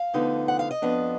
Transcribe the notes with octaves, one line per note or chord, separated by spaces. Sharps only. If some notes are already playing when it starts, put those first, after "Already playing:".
Already playing: F5
D2 D3 F3 B3 D#4
F#5
F5
D#5
F2 F3 B3 D4